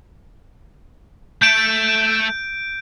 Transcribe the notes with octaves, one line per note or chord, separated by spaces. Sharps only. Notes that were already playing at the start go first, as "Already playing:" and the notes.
A3 G6 D7